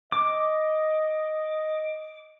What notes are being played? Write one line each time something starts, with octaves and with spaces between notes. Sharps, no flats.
D#5 D6